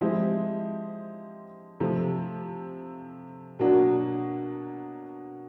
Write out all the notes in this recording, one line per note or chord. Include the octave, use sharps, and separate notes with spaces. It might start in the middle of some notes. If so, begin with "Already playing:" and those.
F3 G#3 C4 E4 G4
C3 F3 A3
B2 F#3 A#3 D4 F#4